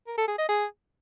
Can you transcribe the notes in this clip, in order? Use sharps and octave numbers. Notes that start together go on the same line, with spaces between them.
A#4
A4
G#4
D#5
G#4